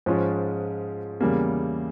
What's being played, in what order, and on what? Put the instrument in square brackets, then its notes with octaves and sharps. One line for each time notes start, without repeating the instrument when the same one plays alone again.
[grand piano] G#2 F3 G#3 C#4 F4
E2 C#3 G3 A#3